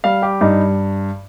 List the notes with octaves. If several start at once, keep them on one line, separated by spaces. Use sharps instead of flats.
G3 F5
G4
G2 D#4